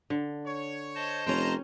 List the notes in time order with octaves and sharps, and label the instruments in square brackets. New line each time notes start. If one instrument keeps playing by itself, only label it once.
[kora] D3
[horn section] C#5
[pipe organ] C5 D#5 A5
[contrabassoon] F1 [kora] C#4 G5 [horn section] A#5 C6